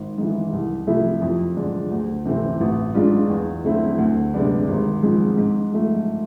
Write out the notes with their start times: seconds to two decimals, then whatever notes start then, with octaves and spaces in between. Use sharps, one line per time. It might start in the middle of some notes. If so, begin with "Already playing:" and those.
Already playing: G#1
0.18 G#2 E3
0.53 C2
0.87 C3 F3 A3 E4
1.22 F2
1.57 D3 G#3 D4
1.91 D2
2.25 C3 E3 A3 C4
2.60 A1
2.95 G#2 G#3 D4 F4
3.30 E2
3.64 D3 A3 C4 E4
3.98 D2
4.34 C3 G#3 B3 D4
4.68 G#1
5.03 G#2 F3 G#3 C4
5.38 G#2
5.72 F3 A3